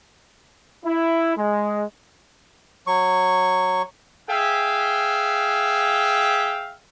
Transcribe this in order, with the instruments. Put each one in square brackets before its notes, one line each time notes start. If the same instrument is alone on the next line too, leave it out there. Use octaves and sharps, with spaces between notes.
[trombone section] E4
G#3
[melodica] F#3 C#6
[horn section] G#4 E5 F5 G5